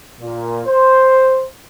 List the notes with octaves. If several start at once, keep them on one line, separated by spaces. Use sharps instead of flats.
A#2
C5